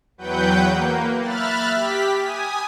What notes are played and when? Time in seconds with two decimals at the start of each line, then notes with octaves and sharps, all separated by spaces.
0.18 E2 F#3 B4 F#5 G5 G6
0.69 A#3
1.20 E5 B5 F6 F#6 A6
1.71 G4 B6
2.19 G#5 D#6